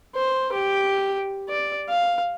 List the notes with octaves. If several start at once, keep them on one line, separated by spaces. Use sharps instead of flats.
C5
G4
D5
F5